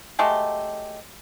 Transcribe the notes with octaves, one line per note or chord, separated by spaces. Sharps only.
F#3 G#3 A3 G4